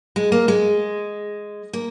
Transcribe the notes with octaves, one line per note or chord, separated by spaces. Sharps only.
G#3
A#3
G#3
A#3